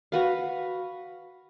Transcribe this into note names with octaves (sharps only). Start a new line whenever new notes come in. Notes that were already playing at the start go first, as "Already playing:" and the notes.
F#4 B4 F5